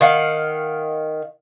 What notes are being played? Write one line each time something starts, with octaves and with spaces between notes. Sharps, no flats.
D#3 F5 F#5